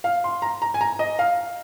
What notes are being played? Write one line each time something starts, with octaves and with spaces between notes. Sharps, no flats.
F5
C6
A#5
A#5
G#5
A#5
D#5
F5